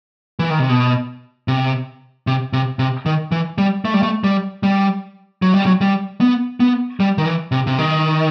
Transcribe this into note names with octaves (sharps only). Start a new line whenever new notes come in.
E3
D#3
C3
B2
C3
C3
C3
C3
D#3
E3
G3
A3
G3
A3
G3
G3
F#3
G3
F#3
G3
B3
B3
G3
D#3
E3
C3
C3
D#3